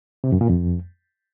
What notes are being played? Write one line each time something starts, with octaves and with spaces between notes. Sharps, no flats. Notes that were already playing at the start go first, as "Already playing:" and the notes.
C3
F#2
A#2
F2